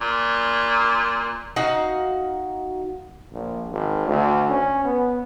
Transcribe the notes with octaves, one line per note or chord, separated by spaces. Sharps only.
A#2
D#4 F#4 F5
A#1
G#1
D2
C#4
B3